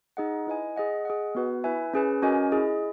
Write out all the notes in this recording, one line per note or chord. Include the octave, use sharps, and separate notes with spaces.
D#4 G#4 D#5 F#5
E4 B4 D#5 G#5
G#4 D#5 F#5
G#4 D#5 F#5
B3 F#4 B4
E4 B4 E5 G#5
C#4 G#4 B4
C#4 F#4 A#4 D#5 G#5
E4 G#4 D#5